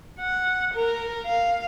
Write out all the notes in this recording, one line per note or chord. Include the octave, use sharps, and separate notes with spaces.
F#5
A#4
F5